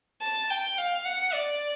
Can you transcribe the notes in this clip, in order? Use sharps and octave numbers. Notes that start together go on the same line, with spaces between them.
A5
G5
F5
F#5
D5